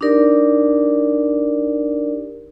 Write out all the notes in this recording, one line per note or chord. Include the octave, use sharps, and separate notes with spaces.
D4 D#4 G4 A#4 D5